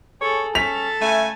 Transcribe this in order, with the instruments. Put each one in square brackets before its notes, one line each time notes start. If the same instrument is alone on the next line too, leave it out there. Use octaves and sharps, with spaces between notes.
[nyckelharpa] G#4 A4 [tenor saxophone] C#5
[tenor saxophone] C#4 [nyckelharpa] A4 A5 [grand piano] B6 F7
[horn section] C#3 E5 G#5 [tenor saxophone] A3